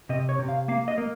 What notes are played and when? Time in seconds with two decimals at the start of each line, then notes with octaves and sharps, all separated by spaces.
0.09 C3 D#5
0.29 C#5
0.39 C3
0.49 F5
0.68 A#3 F5
0.88 D#5
0.98 A#3